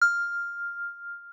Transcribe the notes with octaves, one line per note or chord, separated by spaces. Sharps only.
F6